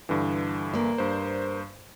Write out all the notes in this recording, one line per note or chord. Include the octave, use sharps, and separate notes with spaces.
G2 D3 E3
A#3 D5
G2 C5